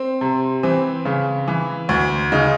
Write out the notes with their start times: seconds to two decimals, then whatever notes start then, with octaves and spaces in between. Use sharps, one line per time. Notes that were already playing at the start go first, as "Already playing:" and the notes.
Already playing: C4
0.21 C3
0.63 E3 C4
1.05 C#3
1.48 E3
1.89 D2
2.32 C#3 D#4